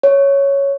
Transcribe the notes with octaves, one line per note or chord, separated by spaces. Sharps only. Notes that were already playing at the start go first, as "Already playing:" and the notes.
C#5